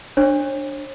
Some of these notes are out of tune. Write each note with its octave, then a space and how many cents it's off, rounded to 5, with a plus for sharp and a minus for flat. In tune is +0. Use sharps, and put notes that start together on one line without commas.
D4 +5 C#5 -40